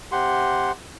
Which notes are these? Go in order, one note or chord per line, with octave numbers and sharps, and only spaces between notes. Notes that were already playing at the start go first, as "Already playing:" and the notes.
C3 G4 F#5 C6